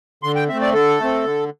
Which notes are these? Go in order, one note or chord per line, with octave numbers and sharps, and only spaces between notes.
D3 C6
G5
A3 C4 E5
D5
D3 A4
A3 C4
D3